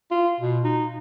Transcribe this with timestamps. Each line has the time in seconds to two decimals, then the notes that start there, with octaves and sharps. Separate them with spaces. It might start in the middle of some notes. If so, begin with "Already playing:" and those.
0.11 F4
0.40 B2
0.64 D#4